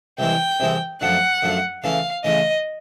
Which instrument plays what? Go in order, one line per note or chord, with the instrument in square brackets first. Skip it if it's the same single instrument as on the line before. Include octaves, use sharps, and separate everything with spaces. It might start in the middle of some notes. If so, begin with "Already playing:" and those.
[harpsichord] C2 C3 E3 G#3 C4 [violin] G5
[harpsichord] C2 C3 E3 G#3 C4
[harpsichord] F#2 D3 F3 A3 [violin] F#5
[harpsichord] F#2 D3 F3 A3
[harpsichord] C#3 E3 A3 C#4 [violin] F5
[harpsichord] C#3 E3 A3 C#4 [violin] D#5